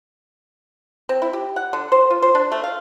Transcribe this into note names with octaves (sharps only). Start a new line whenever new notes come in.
C4
E4
G4
F#5
D3
C5
F4
C5
D4
A3
F5